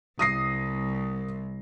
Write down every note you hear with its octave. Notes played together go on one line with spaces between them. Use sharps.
C2 D#6 A#6 C7